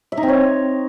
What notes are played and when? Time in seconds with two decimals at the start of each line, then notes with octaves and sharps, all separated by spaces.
0.12 E5
0.17 D#4
0.23 C4
0.28 C#5